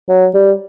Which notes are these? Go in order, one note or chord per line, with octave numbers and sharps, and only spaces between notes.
F#3
G3